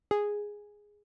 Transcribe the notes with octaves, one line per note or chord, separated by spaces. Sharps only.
G#4